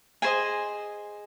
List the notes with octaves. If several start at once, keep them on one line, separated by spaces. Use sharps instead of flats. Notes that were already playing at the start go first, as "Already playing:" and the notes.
G#4 C5 D#5 G#5